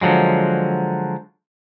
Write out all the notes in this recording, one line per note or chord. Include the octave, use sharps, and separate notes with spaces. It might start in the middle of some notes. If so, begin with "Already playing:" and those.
D3 F3 F#3 G#3